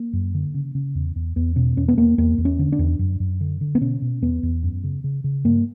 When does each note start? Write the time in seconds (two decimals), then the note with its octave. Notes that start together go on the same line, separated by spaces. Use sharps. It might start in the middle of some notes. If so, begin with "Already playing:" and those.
Already playing: A#3
0.13 F#2
0.34 D3
0.54 C#3
0.75 C#3
0.95 E2
1.16 E2
1.36 E2 B3
1.56 B2 C#4
1.77 E2 C#4
1.88 B3
1.97 E2 A#3
2.18 E2 A#3
2.38 E2
2.45 C#4
2.59 D3
2.72 D4
2.79 E2
2.99 F#2
3.20 F#2
3.41 D3
3.61 D3
3.75 B3
3.81 B2 C#4
4.02 B2
4.22 E2 B3
4.43 E2
4.63 F#2
4.84 C#3
5.04 C#3
5.24 C#3
5.45 G2 A#3